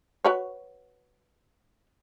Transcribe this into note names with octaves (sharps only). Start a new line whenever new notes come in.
F#4 B4 C#5